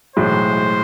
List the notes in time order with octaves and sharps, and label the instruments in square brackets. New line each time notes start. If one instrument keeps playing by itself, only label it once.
[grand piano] B1 A2 E3 G#3 [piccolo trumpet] C5